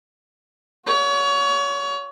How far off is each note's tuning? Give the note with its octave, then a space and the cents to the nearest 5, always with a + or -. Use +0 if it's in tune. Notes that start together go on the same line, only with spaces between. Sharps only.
F#4 -40 C#5 +30